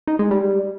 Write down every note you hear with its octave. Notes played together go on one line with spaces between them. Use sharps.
D#4
G#3
G3